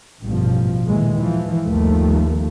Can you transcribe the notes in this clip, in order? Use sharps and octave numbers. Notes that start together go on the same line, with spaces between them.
A1 G2 B2 F3
D#2 A#2 D#3 E3 G#3
E3 F3
G1 D#2 F3 A3 A#3